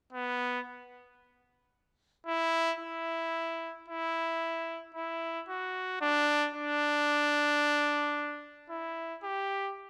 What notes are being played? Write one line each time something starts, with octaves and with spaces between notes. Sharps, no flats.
B3
E4
E4
E4
E4
F#4
D4
D4
E4
G4